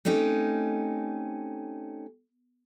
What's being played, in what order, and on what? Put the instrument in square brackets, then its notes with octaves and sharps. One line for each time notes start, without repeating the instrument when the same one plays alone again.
[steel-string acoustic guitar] A3 C4 C#4 D#4 G4